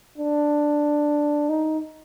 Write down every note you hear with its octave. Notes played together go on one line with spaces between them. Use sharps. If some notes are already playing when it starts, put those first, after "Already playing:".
D4
D#4